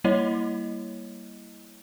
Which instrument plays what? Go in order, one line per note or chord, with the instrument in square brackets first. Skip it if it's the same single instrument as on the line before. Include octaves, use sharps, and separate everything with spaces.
[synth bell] G3 A#3 E4 C#5 D#5